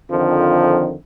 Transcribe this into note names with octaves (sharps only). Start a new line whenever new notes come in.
F2 D3 D#3 F3